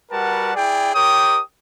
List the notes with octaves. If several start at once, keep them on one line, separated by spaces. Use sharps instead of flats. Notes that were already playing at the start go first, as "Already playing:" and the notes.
G3 F#4 A#4 B4 F#5 A5
E4 G#4 D5 G5
G4 A#4 C#5 G5 D#6